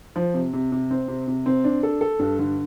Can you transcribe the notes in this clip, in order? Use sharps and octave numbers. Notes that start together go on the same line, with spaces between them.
F3
C3
C3
C3
C4
C3
C3
C4
D4
A4
A4
G2
D3